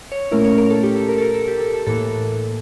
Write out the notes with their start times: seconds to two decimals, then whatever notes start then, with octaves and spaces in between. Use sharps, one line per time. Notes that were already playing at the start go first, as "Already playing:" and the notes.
0.12 C#5
0.32 A#2 A3 C#4 E4 A#4
0.45 C#5
0.58 A#4
0.70 A4
0.83 G4
0.96 A4
1.09 A#4
1.18 A4
1.22 A#4
1.35 A4
1.48 G4
1.61 A4
1.74 A4
1.87 A2 E3 A#3 A4